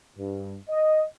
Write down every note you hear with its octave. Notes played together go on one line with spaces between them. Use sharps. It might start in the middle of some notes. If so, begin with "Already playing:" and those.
G2
D#5